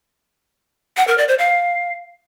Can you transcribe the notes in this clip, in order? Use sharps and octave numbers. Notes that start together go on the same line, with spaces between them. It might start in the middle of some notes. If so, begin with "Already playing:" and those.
F#5
A#4
D5
C5
F5